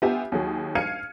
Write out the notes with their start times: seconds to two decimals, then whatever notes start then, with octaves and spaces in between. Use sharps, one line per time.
0.02 B3 F4 G4 E5 G#5
0.32 D#2 F#3 G#4
0.75 F5 F6 G#6 C#7 D#7